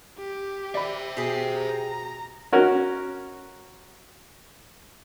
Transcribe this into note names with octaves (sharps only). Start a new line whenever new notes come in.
G4
C5 D5 E5 B5
B2 G4 G#4 C7
A#5
C#4 F#4 A#4